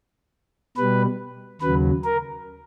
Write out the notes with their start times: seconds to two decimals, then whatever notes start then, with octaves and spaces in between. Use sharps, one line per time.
0.77 B2 G3 B4
1.62 D#2 C#3 F#3 B4
2.04 A#4